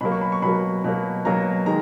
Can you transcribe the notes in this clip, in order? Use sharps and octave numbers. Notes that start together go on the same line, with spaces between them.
B2 F#3 A#3 B5
C#6
B5
C#6
B2 F#3 A#3 B5
B2 F#3 A#3
B2 F#3 A#3 A#5
D#3 G#3 A#5